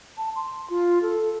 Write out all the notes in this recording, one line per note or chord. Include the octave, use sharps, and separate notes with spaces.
A5
C6
F4
A4